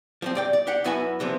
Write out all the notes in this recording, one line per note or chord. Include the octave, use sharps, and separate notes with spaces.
F3 A3 C4
G2 D5 G5
D5
D4 G4 F#5
F#2 B3 E4 F#4 B4 G#5
C3 E3 F3 B3